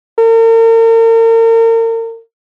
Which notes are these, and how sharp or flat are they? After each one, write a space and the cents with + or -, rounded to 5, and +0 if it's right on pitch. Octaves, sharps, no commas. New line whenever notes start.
A#4 -40